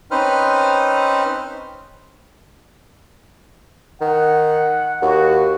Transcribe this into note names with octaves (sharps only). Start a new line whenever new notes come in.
C4 C#4 D#4 B4 C5 F6
D#3 F#5
D#2 F#4